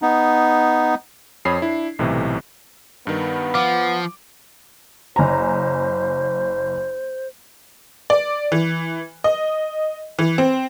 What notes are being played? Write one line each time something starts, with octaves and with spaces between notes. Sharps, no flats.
B3 D#4
F2 C#5 B5 D#6 C7
D4 E4
B1 A2 C3 E3
G2 D#3 B3
F3 F#5 D6
F#1 C5 G#5 A#5
D5
E3
D#5
E3
C4